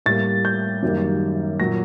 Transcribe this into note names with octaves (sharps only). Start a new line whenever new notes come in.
A2 G3 A#3 A6
G6
F#2 D#3 G3 A#3
A#2 F#3 A#3 A#6